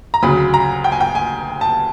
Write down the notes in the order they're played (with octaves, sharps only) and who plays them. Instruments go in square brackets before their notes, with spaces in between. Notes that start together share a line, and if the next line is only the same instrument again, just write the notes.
[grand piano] A#5
D2 C#3 F#3 B5
A#5
G5
G#5
G5
G#5
A5